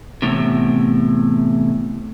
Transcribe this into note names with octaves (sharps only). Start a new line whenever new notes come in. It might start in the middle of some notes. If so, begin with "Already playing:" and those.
E2 A2 C3